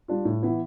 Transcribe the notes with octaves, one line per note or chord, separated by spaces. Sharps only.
G3 D4 F4
A2
E3 B3 E4